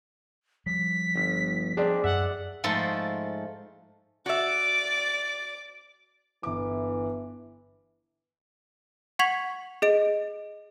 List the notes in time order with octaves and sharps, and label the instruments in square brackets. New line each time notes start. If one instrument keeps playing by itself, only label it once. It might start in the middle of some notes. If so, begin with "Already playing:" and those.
[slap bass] F3 G3 [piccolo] B6
[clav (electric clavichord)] G1
[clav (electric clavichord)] C4 D4 [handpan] G#4 D5
[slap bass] F#2 [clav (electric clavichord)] E5 [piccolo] F#5
[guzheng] G#2 F3 A3 A4 C6
[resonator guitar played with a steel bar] F#4 E5 [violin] D5 D6
[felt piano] G1 D6 [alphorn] E3
[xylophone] F#5 C#6 G#6 B6 F7 F#7
G#4 D#5 D7